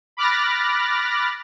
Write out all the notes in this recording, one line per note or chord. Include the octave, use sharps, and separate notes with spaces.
B5 D6 F6 F#6 A6 A#6